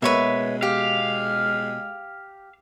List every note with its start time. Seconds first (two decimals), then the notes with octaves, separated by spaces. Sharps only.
0.02 B2 G#3 A#3 B4 C#5 E5
0.63 G4 F5